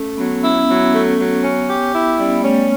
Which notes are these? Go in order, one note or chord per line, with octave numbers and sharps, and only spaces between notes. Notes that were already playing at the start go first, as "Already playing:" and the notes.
Already playing: A3 C#4
F#3 B3
C#4 E4
F#3 B3
A3
F#3
C#4
G4
E4
G3 C#4
B3
A3 C#4
B3